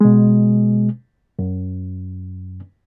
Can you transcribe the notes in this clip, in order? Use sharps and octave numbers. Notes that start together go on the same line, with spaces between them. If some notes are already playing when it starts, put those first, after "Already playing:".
B2 G#3
F#2